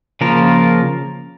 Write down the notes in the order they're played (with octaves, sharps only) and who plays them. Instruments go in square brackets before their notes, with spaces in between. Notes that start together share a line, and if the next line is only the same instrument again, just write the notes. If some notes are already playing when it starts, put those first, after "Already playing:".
[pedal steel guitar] C#3 F3 A#3 F4 A#4